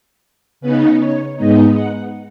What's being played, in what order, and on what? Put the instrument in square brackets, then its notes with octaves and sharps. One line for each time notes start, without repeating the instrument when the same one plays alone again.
[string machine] C#3 B3 D#4 B4
C#5
G#2 G#3 B3 D#4 D#5
F#5